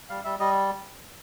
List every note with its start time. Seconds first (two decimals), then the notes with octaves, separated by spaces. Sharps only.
0.10 G3 F5
0.24 G3 E5
0.40 G3 D#5